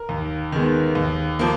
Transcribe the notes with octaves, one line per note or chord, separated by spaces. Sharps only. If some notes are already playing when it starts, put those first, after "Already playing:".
Already playing: A#4
D#2
D#3 G#3 B3
D#2
F3 A#3